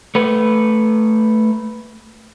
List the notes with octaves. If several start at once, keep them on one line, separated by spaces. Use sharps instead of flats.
A3 B4